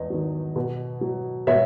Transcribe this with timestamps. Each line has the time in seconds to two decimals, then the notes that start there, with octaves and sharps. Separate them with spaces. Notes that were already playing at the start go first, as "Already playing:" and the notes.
Already playing: E2 D#5
0.10 D#3 F#3
0.56 B2
1.01 F#3
1.47 B2 C#5 E5